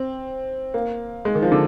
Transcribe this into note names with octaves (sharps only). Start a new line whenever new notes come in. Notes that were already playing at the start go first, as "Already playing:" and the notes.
Already playing: C4
A#3
G#3
D#3
F3
D3